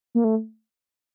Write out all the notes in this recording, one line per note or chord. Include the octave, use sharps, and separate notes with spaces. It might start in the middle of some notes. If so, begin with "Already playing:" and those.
A#3
A3